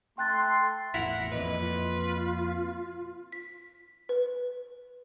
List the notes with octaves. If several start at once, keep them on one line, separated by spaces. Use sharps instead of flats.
A3 G5 C6 F#6 A6
A1 E2 E4 A#4 F#5 B5
F2 A#2 B4 D#5
F4
B6
B4